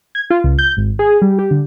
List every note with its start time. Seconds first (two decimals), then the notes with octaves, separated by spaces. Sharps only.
0.15 G#6
0.30 F4
0.44 C#2
0.59 G6
0.77 G#1
0.99 G#4
1.22 G3
1.39 G4
1.51 D3